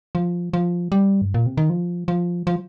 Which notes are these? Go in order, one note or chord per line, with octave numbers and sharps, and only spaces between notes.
F3
F3
G3
G2
A#2
C3
D#3
F3
F3
F3